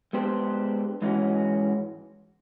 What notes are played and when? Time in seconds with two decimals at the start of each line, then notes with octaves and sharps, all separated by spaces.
0.13 G#3 B3 D4 G4 C5
1.02 G#2 E3 G#3 C#4 F#4